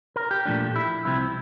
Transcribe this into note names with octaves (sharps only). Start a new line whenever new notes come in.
A#4
G4
A#2 F3 A3 D4
E4
C2 C3 F3 C4 E4